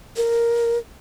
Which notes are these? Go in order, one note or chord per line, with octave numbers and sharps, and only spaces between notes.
A#4